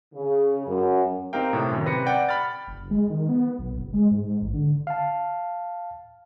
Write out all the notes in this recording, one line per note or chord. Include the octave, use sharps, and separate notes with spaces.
C#3
F#2
C4 D#4 G4 A#4 F5 G5
A2 C3
F#2 D#3
C3 B4 A#6 C#7
D5 F#5 G5
B5 F6 A6
F#1
G#3
D#3
B3
B1
F#1
G#3
G#2
A1
D3
F5 A5